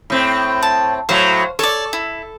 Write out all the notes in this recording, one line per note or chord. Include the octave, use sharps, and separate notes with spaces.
A2 C4
A5
A2 F#3 C5 C#5 F5
A4 C#5 D5
E4